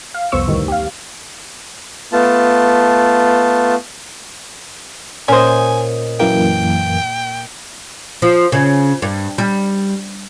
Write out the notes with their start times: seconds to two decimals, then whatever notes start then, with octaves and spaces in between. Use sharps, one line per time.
0.14 F5
0.32 C2 F2 B3 C5 C#6 E6
0.47 D2 A2 D#3 G3
0.68 G4 F5
2.12 A3 B3 F4 A5
5.28 A#2 C#4 C5 D#5 G#5
6.20 F#2 E3 A#3 G5
8.22 F3
8.52 C#3
9.02 G2
9.38 G3